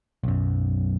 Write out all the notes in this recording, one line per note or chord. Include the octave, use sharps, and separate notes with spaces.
B1 F#2